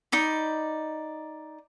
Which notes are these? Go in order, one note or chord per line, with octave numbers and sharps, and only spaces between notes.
D#4 D5 B5